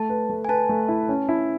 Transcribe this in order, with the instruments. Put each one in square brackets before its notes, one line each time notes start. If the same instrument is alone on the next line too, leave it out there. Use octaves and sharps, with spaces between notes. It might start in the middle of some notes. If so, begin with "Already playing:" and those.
Already playing: [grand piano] A3 [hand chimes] A5
[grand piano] B4
A3
[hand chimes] G#5
[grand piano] B4 [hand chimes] A5
[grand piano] A3
E4
C#4
E4